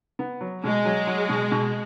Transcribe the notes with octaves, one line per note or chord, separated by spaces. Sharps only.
B3
F#3
B2 G#3
F#3
F#3
B2
B2